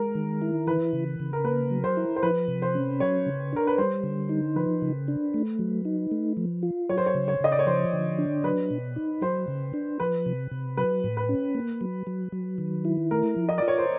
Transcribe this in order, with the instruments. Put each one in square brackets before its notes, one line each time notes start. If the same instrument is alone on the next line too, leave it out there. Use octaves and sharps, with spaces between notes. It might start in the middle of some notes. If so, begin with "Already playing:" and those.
Already playing: [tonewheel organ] G#3 [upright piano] A#4
[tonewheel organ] D#3
E4
[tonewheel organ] E3 [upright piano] B4
[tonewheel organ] C#3
C#3
[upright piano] A#4
[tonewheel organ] A#3 [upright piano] B4
[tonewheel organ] F#3
[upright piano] C5
[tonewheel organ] E4
[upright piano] C5
[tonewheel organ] F3 [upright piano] B4
[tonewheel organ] C3
[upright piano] C5
[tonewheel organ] C#4
[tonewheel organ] F#3 [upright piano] C#5
[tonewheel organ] C#3
[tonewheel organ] D4 [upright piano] A#4
[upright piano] B4
[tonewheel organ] G3 [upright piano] C5
[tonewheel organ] D3
D#4
[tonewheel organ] F3 [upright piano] B4
[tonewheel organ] C#3
D4
A3
F#3
D#4
A3
F3
F4
[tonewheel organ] F#3 [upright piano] C#5
[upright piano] C5
C#5
[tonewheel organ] C#3
[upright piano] C#5
[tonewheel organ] C#3 [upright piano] D#5
[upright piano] D5
C#5
[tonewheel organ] F3 [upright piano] C5
[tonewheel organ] D3
D4
[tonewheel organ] F#3 [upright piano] B4
[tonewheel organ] B2
D#4
[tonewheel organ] F#3 [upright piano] C5
[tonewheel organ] C#3
D4
[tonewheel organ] F3 [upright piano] B4
[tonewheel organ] C3
C3
[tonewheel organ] F#3 [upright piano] B4
[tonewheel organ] A2
[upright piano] B4
[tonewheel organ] C#4
A#3
F#3
F#3
F#3
D#3
E4
[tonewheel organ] A3 [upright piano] A#4
[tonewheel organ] F3
[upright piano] D#5
[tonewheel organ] F4 [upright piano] D5
[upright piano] C#5
C5